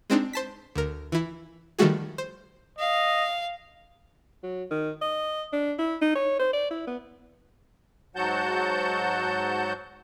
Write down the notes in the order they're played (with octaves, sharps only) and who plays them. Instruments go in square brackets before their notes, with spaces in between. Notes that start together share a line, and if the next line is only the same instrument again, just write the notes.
[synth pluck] G#3 C4 D4 D#4
C5 A5 B6
D2 A#4
E3 E4
D#3 F3 G3 A3 F#4 G#4
C5
[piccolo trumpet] D#5 [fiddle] F5
[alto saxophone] F#3
D#3
D#5
D4
E4
D#4
C#5
C5
D5
E4
B3
[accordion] G#2 F#3 F#4 F#5 A5 G6